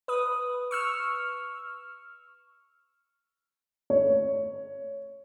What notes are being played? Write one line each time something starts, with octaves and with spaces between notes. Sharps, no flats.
B4 D#6
C#6 E6 F6
C#5